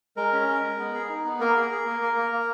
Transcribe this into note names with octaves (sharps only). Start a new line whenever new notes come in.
G#3 A#4
C#4
G#3
G#3
B3
G#4
D#4
B3
A#3 A#4
G#4
G#4
A#3
A#3
A#3
A#3